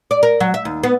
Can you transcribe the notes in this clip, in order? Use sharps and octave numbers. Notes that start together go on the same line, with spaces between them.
D5
A#4
F#3
E5
D#2
B3